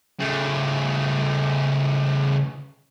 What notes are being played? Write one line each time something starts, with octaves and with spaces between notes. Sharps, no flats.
C#3 A3